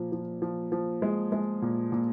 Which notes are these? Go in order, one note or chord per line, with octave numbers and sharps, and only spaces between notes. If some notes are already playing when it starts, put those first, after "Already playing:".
Already playing: A#2 F3
F3
F3
F3
G#3
G#3
A#2
A#2